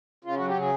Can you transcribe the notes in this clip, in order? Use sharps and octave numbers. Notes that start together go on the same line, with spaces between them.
C#3 F4
F#3 F#4
G4
C#3 G#4